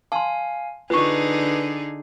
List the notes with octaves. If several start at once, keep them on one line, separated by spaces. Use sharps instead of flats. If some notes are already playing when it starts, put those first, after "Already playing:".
F5 G#5 A5 C6
D3 D#4 F4 G#4 B4 C#6